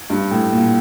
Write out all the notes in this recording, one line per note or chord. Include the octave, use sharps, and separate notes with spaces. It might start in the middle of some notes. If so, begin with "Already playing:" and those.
G2
A2
A#2